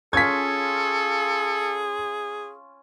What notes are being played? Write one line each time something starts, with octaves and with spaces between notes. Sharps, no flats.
C#4 F4 G#4 A4 G#6 B6